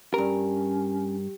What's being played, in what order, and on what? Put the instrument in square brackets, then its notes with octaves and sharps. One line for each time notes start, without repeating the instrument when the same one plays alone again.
[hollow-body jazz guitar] G2 A#4 [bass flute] C#4 [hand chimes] G4